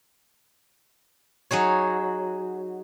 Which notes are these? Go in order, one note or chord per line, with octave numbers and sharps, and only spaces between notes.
F#3 D#4 G#4 C#5